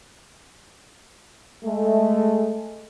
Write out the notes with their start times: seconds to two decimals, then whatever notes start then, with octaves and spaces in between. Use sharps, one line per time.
1.64 G#3 A3